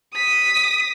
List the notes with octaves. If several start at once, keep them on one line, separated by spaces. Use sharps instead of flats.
D#6 B6